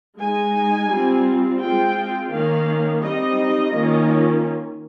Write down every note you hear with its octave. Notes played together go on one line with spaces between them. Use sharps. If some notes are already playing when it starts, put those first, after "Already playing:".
G#3 D#4 G#5
G3 C4 F4
G#3 C4 F4 G5
D#3 A#3 C#4 F5
G3 C4 D#4 D#5
D#3 A#3 C#4 F4